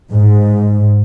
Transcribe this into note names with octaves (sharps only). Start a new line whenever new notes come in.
G#2